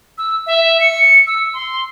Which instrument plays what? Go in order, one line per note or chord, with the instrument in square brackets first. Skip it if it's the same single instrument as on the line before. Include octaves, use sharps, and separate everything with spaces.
[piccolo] E6
E5
C#7
E6
C6